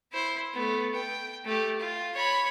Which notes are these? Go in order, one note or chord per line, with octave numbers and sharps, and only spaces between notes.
E4 C5
A3 B3
G5
A3 G4
F4
C#5 B5